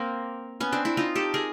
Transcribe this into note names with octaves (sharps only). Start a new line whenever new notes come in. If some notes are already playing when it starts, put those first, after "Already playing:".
Already playing: A#3 C4
B3 C#4
C4 D4
D4 E4
D#4 F4
G4 A4
G#4 A#4